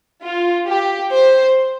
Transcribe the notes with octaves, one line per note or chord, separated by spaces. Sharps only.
F4
G4
C5